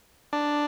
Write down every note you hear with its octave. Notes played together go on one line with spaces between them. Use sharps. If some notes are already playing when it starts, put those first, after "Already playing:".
D4